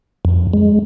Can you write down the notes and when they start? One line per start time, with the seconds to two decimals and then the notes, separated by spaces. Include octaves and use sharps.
0.25 F2
0.53 G#3